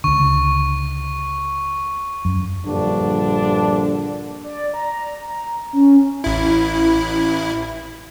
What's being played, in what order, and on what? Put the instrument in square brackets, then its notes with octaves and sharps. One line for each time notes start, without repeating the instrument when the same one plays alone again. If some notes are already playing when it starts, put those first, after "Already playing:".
[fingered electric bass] C#2 D3 [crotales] C#6
[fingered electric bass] F#2
[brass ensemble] A#1 G2 D3 D4
[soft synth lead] D5
A#5
C#4
[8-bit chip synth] A1 E4